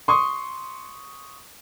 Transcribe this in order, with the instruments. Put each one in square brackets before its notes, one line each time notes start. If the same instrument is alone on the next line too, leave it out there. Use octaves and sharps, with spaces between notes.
[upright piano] C6 C#6 D#6